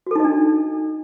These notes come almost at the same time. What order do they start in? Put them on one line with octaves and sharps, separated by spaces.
F#4 A4 D#4 D#5 D4